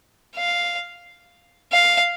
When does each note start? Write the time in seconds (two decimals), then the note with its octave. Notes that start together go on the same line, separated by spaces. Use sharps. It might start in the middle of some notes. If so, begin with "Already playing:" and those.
0.36 F5
1.72 F5